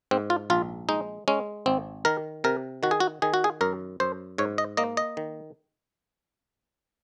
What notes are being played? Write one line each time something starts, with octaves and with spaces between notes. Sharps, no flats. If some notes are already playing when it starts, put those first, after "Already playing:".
G#2 C4
F4
A#1 F4
G#3 D#4
G#3 C#4
G#1 C4
D#3 A#4
C3 A#4
D#3 F#4
G#4
F#4
D#3 G#4
F#4
G#4
F#2 A#4
F#2 C5
G#2 C#5
D#5
A#3 D#5
D#5
D#3